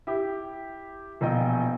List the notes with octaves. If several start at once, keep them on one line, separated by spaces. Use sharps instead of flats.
E4 G4
E1 A#1 D#5 G5